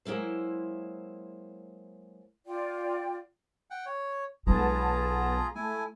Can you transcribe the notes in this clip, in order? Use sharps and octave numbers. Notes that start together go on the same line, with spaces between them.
F#3 G#3 A#3 E4 C5
F4 D5 G5
F#5 G5
C#5
B1 G#3 B3 F4 G#4 A5 A#5
A3 E4 G#5